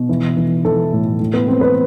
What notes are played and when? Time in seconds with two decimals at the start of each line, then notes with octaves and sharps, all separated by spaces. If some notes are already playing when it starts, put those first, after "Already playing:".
Already playing: B2
0.09 E3
0.37 E3
0.65 E3 A4
0.93 A2
1.20 A2
1.34 B3
1.47 E3 C4
1.61 B4